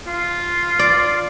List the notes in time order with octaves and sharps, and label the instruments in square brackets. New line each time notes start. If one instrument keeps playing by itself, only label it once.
[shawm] F4
[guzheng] D5